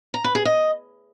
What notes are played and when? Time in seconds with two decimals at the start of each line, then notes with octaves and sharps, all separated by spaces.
0.14 A#5
0.24 B4
0.35 G#4
0.45 D#5